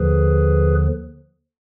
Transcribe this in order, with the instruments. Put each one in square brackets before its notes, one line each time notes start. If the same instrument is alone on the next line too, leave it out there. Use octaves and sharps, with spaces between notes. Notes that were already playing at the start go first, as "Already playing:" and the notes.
Already playing: [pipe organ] D#2 D3 F3 G#4 B4